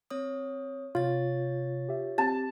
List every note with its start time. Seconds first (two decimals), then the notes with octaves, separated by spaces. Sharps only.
0.10 C4 C#5 D#6
0.95 C3 F4 C#5 A6
1.89 G4 E5
2.18 C4 G4 A5